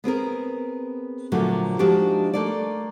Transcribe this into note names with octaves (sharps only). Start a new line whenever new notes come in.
B3 C4 G#4 A#4
A#2 D3 F3 F#3 A3
F3 G#3 D4 D#4 F#4 G4
A3 A#3 D5